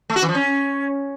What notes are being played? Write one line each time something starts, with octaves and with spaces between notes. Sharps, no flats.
A3
F#4
E3
F3
C#4